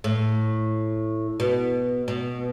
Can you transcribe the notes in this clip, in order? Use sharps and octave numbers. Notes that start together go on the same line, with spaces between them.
A2
B2
B2